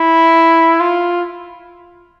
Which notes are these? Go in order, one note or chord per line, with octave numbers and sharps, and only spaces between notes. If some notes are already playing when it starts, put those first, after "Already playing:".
Already playing: E4
F4